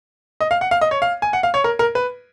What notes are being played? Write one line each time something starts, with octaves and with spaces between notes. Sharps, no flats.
D#5
F5
F#5
F5
D#5
C#5
F5
G#5
F#5
F5
C#5
A#4
A#4
B4